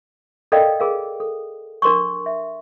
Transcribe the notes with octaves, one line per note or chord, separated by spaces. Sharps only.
A4 A#4 D5 D#5 F5 G5
G#4 A#4 F5
A4
D4 A#4 C6 C#6
E5